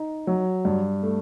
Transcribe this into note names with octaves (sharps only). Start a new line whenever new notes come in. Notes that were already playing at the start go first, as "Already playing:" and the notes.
Already playing: D#4
F#3
G2
A3